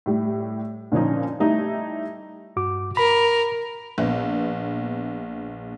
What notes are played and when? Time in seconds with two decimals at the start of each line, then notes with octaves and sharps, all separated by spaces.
0.06 A2 G3
0.92 A#2 D3 F3 C#4 D#4
1.40 G3 A3 D#4 E4
2.56 G2 F#4 D6
2.97 A#4 B5
3.98 A#1 B3